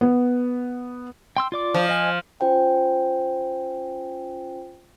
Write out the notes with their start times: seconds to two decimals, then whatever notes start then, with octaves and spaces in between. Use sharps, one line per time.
0.01 B3
1.37 G5 C6 E6
1.52 F4 D5 D6
1.74 F3
1.89 D#5 G#5
2.40 C#4 F4 C5 G5 G#5